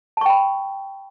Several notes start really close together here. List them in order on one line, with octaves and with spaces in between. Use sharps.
A5 C#6 G5 B5